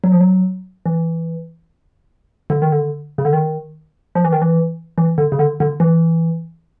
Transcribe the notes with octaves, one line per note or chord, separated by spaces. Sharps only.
F#3
F3
F#3
E3
D3
D#3
D3
C#3
D3
D#3
F3
E3
D#3
E3
E3
D3
C#3
D3
D3
E3